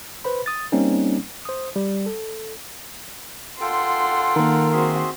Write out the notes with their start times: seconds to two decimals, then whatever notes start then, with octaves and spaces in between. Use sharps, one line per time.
0.24 B4 C5 B5
0.46 D#6 A6
0.72 G3 A#3 C4 C#4 D#4
1.45 C5 D#6
1.76 G3
2.06 A4
3.61 F4 A4 F#5 G5 C6
4.36 D#3 A#3 A#4
4.72 C4 F#4 G#4 E5 C6